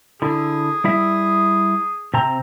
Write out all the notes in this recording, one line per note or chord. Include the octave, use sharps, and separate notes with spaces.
D3 E4 G#4
G3 E4 E5
C3 C4 A#5